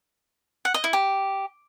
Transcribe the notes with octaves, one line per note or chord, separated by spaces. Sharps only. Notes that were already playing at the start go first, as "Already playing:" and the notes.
F#5
D#5
E4
G4